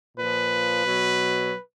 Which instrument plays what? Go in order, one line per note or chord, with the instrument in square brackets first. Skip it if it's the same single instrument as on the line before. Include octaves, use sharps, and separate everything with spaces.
[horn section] A#2 F3 B4
B2 F#3